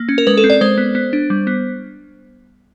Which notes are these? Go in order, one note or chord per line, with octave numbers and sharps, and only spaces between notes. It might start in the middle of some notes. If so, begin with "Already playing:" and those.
Already playing: A#3
C#4
A#4
G#3 B4
A4
C4
D5
G#3 C5
B3
B3
D4
G3
B3